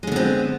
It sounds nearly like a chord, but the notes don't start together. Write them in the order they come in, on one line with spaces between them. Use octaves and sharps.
G#3 D3 B3 C4